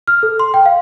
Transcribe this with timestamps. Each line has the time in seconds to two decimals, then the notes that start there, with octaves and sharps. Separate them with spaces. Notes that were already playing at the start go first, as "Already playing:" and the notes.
0.08 F6
0.23 A4
0.40 C6
0.54 G5
0.66 F5